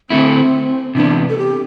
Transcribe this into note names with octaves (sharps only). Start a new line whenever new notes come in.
D3 A3 C4 E4
C3 E3 B3 D4
A4
G4